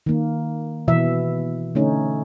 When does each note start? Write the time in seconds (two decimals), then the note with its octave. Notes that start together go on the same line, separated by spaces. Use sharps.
0.06 D#3 A#3
0.88 B2 E3 E5
1.75 D3 A3 C#4 D#4